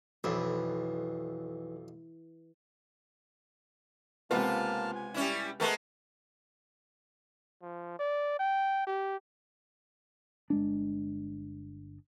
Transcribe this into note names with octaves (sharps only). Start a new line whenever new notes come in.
B1 F2 E3
C#2 C3 A#3 B3 F4 A5 F6
G#5
G3 C#4 E4
G#3 A3 B3 A#4 A5
F3
D5
G5
G4
G1 G#3 D4